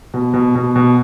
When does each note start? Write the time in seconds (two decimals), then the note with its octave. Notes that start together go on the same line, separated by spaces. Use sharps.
0.14 B2
0.34 B2
0.55 B2
0.76 B2